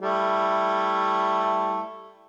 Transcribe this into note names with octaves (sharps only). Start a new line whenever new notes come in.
G3 A3 E4